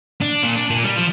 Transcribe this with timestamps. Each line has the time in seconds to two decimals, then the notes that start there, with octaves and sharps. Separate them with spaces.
0.21 D4
0.43 A#2
0.55 D4
0.70 A#2
0.84 G3
0.96 F3